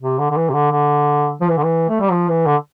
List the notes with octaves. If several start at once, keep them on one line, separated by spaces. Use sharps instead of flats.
C3
D3
D3
E3
C3
D3
D3
F3
E3
D3
E3
A3
G3
F3
E3
D3